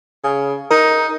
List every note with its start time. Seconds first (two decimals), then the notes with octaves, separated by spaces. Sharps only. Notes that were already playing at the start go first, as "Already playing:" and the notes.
0.24 C#3
0.71 D#4 A#4